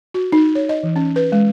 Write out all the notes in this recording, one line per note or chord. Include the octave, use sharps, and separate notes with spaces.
F#4
D#4
C#5
D#5
E3
C#4
B4
G#3